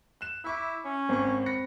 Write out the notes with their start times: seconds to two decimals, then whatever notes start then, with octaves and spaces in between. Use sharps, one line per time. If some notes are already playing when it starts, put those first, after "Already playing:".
0.21 F#6 E7
0.44 E4 E5 C#6 D6
0.85 C#4
1.09 G#1 A#3 C4 C#6
1.46 B5 A#6 C#7